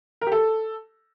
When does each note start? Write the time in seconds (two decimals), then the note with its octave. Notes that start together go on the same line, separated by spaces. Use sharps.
0.21 A#4
0.27 G4
0.32 A4